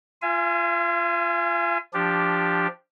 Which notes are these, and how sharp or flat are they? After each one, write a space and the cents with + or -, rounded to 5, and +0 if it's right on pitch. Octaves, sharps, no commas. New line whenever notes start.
F4 -15 F5 -45 G#5 +0
F3 +0 D4 +0 G4 +0